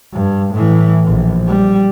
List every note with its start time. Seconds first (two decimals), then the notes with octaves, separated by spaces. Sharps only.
0.14 G2
0.54 A2 E3
1.06 A#1
1.48 G3